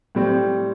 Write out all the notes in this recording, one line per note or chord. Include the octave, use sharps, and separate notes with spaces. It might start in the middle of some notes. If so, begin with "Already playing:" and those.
A2 G3 C4